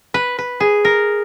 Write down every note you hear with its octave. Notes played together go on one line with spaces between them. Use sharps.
B4
B4
G#4
A#4